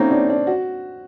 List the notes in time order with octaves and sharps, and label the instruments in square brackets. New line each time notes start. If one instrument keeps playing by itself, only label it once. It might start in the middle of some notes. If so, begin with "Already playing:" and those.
Already playing: [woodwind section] A2 F#3 A#3 D#4 [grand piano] C4 C#4
[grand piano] D4
D4
F#4